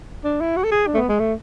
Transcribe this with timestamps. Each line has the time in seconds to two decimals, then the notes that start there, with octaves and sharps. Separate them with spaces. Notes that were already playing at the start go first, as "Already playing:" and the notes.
0.24 D4
0.41 E4
0.56 F#4
0.64 A4
0.72 G#4
0.87 D4
0.94 A3
0.97 B3
1.09 G#3
1.19 A3